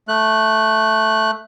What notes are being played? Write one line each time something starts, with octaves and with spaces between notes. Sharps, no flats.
A3 F#6